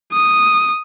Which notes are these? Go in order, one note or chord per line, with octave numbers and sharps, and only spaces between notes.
D#6